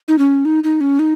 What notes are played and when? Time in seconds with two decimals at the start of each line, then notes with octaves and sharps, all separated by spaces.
0.08 D#4
0.18 C#4
0.45 D#4
0.64 D#4
0.81 C#4
0.99 D#4